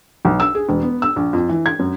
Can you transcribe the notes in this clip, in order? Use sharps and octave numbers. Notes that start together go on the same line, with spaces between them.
B1
E6
G#4
E1
B3
E6
A#1
F2
E3
G#6
F#2